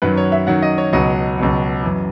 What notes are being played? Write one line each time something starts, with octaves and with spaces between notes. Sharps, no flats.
F#2 D#3 F#3 B4
C#5
E5
F#2 D#3 F#3 F#5
D#5
C#5
C#2 B2 F#3 D#5
C#2 B2 F#3
F#2 E3